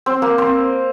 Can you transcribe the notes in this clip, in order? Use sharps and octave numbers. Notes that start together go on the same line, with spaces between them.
C4 C5
A#3 A#4
C4 C5